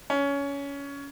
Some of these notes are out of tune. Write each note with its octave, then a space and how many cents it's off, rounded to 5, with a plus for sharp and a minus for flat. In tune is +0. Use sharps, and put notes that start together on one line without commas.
C#4 +20